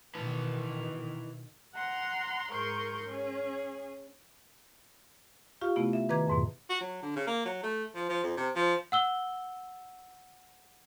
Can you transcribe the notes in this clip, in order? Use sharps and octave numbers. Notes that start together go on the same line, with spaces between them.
B2 D#3 E4 B4 A5
F#5 A#5 C6
G#2 G#4 A#4 C6 C#6 G6
C#4 G#4
F4 G4 F5 C#6
C3 A3 B3 E4
E5
D#3 B4 A#5 D6 G#6
F2 G#2 B2
F#4
F#3
D3
C#3
A#3
F#3
A3
F3
F3
F2
C3
F3
F#5 E6 G7